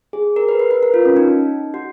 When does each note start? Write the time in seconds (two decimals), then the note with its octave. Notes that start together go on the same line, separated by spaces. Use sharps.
0.13 G#4
0.36 A#4
0.49 B4
0.59 B4
0.71 B4
0.83 A#4
0.94 F4
1.05 C#4
1.17 D#4
1.74 F#4